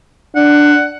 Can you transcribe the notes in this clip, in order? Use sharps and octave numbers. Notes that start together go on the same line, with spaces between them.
D4 F#5